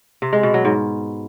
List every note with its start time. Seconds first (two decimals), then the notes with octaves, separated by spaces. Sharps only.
0.22 C3
0.33 G#3
0.43 B2
0.54 F#3
0.65 G#2